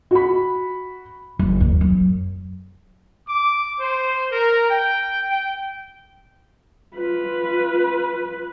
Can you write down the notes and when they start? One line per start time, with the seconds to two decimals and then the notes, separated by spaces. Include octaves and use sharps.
0.11 F#4 B5
1.39 F#1
1.60 D#2
1.81 F#2
3.28 D6
3.80 C5
4.32 A#4
4.70 G5
5.30 G5
6.96 F4 B4